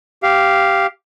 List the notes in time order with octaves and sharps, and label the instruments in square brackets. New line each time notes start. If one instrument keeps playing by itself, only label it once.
[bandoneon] G4 F5